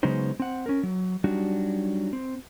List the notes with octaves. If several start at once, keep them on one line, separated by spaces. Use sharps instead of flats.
C#3 F#3 G#3 B3 D#4 C5
C4 F#5
C#4 A#4
F#3
F#3 G3 D4 D#4 F#4
C4